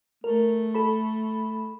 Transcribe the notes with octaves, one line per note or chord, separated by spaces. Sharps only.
A3 A#4
A4 B5